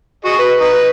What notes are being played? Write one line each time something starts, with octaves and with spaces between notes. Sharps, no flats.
F#4 G#4 D#5
B4
D#4 B4